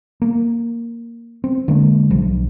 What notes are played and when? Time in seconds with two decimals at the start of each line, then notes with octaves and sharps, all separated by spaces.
0.22 A#3
1.44 C4
1.68 D3 G#3 A#3
2.11 B1 F3